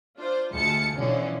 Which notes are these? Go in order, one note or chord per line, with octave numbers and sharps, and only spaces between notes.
D4 F4 C5
D2 G#3 A3 F4 A5 C#7
B2 D3 E3 F3 C#4